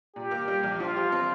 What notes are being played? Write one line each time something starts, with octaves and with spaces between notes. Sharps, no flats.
A#2 G4
A#3
G3
A#1
F3 F4
G4
C4